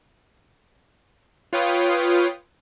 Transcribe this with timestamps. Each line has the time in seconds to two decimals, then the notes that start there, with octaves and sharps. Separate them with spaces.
1.53 F4 B4 C#5 F5 G5 D#6